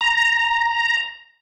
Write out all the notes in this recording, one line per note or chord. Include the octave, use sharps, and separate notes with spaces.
A#5